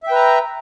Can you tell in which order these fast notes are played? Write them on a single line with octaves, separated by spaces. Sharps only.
E5 G5 B4 A#5